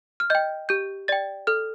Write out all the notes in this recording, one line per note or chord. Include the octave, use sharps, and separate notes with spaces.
F6
D#5 G5 G6
G4 G6
D5 G5 A6
A4 F6